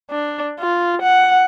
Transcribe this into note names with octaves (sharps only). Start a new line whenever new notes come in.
D4
F4
F#5